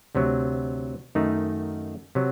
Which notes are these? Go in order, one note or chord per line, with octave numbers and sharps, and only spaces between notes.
D2 C3 F#3
F#2 D#3 A3 D#4
C3 F#3